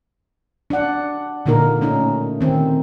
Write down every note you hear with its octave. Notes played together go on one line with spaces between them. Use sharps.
D4 F#5
A#2 D3 A#3 D#4 A#4
A3 C#4 D#4
D#3 C4